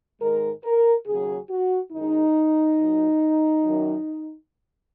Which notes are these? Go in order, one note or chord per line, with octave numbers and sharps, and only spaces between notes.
G#2 D#3 G#3 A#4
A#4
D#2 C#3 F#3 G#4
F#4
F#2 D#3 G#3 D#4
A#2 F#3
F#2 D#3 F#3